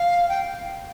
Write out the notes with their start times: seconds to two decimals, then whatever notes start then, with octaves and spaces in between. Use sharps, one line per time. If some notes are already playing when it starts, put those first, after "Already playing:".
Already playing: F5
0.29 G5